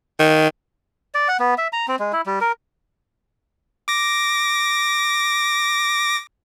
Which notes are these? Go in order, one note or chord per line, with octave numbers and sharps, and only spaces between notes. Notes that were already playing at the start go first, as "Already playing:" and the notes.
D#3
D5
F#5
B3
E5
A#5
C4
G#3
E4
G3
A#4
D6 A#6